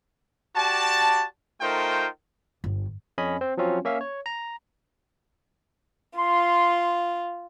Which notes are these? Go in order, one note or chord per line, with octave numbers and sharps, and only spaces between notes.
F#4 G4 D5 A5
A3 D#4 F4 A#4 C5 G5
G1
F2 C#4 D#5 G#5 B5
C4 C5
F3 F#3 C4 C#4 F4
A#3 C#4 E5 F5
C#5
A#5
F4 C6